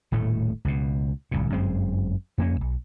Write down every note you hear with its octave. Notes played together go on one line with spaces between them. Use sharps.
D#1 A2 A3
C#2 B2
D1 C2 A#2
G1 F#2 G#3 C4
F2 A#3 C#4
B1